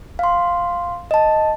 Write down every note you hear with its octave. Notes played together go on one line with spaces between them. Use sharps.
F5 C6
D#5 A5